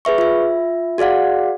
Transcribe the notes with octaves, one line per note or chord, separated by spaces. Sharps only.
G#4 B4 E5 C#6
F4 E5
F#4 G#4 D5 F5 F#5